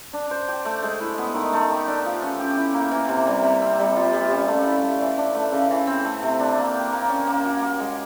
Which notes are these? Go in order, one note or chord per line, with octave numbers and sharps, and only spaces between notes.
D4
C5
G4
A3
G#3
E4
B3
D#3
A3
G4
D4
F3
C#4
G4
E4
A#3
E3
C3
G3
C3
C4
G3
F4
G3
C#4
A3
E4
A3
E3
D4
A3
C#3
E3
C4
A3
C3
D4
A#3
G4
A#3
C#4
A#3
F#4
A#3
G#3